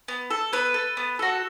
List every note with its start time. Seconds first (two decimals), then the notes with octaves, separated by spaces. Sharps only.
0.08 B3
0.30 A4
0.53 B3 B4
0.74 A4
0.97 B3
1.19 F#4 A4